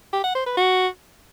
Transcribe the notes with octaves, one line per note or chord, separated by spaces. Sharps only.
G4
F#5
C5
B4
F#4